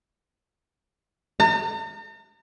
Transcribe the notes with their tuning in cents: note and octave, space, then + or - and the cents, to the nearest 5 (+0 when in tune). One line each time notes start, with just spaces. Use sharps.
A#5 -45